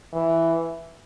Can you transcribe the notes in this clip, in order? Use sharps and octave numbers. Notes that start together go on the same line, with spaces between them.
E3